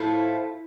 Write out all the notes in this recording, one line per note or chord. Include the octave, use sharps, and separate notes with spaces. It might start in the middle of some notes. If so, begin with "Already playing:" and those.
Already playing: A2 F3 A3 E4